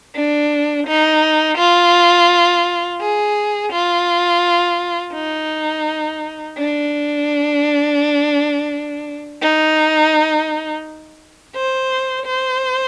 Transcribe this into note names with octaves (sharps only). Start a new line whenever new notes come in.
D4
D#4
F4
G#4
F4
D#4
D4
D#4
C5
C5